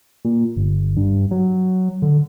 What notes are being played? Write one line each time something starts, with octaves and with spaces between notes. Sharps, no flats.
A#2
G1
G2
F#3
D3